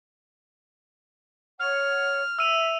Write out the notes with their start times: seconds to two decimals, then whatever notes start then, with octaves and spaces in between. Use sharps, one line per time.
1.60 C#5 F#5 F6
2.39 E5 E6 D#7 F7